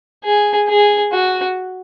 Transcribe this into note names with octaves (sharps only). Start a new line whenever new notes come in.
G#4
G#4
F#4